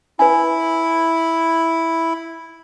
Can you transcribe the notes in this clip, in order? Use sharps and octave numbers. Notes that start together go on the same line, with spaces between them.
E4 B4 G#5